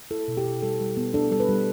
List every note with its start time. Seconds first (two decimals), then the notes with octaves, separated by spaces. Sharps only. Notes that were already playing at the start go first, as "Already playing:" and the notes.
0.11 E4 A4
0.28 B2
0.37 G4
0.45 B2
0.62 G3 A4
0.81 G3
0.97 B3
1.14 D4 A4
1.31 G3 A4
1.40 B4
1.49 G3